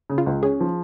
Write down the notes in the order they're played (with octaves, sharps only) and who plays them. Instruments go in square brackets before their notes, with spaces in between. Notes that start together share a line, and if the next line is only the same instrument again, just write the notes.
[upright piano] C#3
[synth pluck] F4
[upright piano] C#2
[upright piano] C#4 [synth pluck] G#4
[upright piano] F3